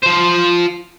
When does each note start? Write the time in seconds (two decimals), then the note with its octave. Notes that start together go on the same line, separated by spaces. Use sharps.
0.03 F3 C5